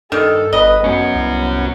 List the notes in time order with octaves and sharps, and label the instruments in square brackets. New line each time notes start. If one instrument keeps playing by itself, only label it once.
[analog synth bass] G2 [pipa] D#3 [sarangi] A4
[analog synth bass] G1 [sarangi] B4 [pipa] D#5
[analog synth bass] F#2 [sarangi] B3 [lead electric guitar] C#4 F#4
[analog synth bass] C2